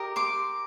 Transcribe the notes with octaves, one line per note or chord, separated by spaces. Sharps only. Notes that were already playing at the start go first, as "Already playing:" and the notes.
Already playing: G4 A#4 D#5
C6 D6